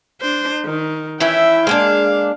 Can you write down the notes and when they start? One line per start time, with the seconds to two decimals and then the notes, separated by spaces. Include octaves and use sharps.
0.21 D4 C5
0.66 D#3
1.20 E3 C#4 E4 E5 G5
1.67 G#3 A#3 D4 F5